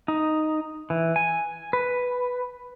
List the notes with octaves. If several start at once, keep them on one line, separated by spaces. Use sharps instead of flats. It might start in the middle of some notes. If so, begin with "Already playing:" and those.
D#4
E3
G#5
B4